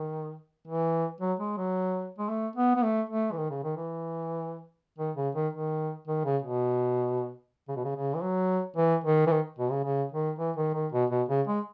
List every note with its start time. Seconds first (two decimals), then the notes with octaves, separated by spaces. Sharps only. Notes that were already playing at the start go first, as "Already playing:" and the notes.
Already playing: D#3
0.67 E3
1.21 F#3
1.40 G#3
1.57 F#3
2.18 G#3
2.29 A3
2.56 B3
2.76 B3
2.83 A3
3.10 A3
3.32 E3
3.37 D#3
3.50 C#3
3.64 D#3
3.77 E3
4.98 D#3
5.16 C#3
5.35 D#3
5.53 D#3
6.08 D#3
6.25 C#3
6.42 B2
7.68 C#3
7.76 B2
7.84 C#3
7.96 C#3
8.15 E3
8.23 F#3
8.76 E3
9.04 D#3
9.27 E3
9.31 D#3
9.58 B2
9.71 C#3
9.85 C#3
10.12 D#3
10.39 E3
10.57 D#3
10.74 D#3
10.93 B2
11.10 B2
11.29 C#3
11.48 G#3